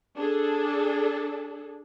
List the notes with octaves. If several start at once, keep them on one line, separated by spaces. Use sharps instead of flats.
D4 G#4 A4